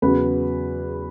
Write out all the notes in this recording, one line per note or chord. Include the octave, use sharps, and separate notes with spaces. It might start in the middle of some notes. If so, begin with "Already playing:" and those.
E2 C#3 F#3 B4